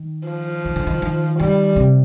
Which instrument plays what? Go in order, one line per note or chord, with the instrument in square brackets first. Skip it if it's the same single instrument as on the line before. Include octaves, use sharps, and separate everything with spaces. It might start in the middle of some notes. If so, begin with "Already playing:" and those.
Already playing: [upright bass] D#3
[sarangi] F3
[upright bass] D#3
D3
D#3
D#3
[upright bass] D#3 [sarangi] G3
[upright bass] C3